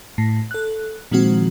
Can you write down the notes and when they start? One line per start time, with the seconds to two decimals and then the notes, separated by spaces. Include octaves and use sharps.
0.18 A2
0.51 A4 F#6
1.11 A#2 D#3 F3 G#3 C4 F#4